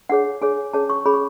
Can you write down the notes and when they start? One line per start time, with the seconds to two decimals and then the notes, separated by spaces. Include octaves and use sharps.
0.09 D4 G#4 C#5 F#5
0.42 D4 G#4 C#5 G#5
0.73 C#4 G#4 C#5 A5
0.90 C#6
1.06 C#4 G#4 C#5 B5
1.14 C#6